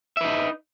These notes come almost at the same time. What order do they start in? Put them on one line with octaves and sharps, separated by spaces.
E5 B4 D#4